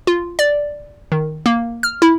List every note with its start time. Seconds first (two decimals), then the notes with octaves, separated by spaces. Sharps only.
0.07 F4
0.39 D5
1.12 D#3
1.46 A#3
1.83 F6
2.02 E4